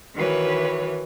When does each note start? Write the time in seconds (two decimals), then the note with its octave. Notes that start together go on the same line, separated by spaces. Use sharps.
0.15 D#3 E3 F#4 B4 C#5